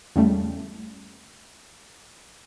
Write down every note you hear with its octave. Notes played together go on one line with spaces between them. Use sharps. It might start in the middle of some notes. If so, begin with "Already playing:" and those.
E2 C#3 G3 A3